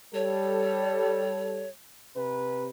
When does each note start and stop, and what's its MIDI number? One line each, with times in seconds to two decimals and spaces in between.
0.14 1.65 55
0.14 1.65 69
0.14 1.69 73
2.16 2.69 48
2.16 2.69 71